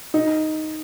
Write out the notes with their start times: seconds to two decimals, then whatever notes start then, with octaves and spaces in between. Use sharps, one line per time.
0.14 D#4